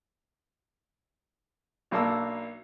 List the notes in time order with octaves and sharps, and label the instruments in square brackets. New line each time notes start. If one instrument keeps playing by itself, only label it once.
[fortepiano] B1 F#3 A#3 D4 A5 E6